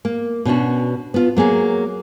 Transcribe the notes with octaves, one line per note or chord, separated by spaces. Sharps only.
A#3
B2 C#4 D4 F#4
B3 F4
F#3 A#3 G#4 C#5